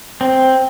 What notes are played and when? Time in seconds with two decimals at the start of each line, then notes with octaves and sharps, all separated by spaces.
0.21 C4